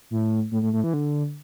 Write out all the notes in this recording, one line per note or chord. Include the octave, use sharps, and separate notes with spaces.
A2
A2
A2
A2
E3
D3